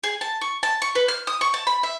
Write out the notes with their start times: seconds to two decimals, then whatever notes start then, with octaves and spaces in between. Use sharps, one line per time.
0.04 G#4
0.21 A5
0.42 C#6
0.63 A5
0.82 C#6
0.95 B4
1.08 F6
1.27 D#6
1.41 C#6
1.54 A5
1.67 B5
1.83 E5